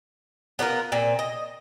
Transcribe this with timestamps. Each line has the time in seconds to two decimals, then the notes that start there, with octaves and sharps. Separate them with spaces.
0.59 B3 D4 F4 A#4
0.92 A#2 C4
1.19 D#5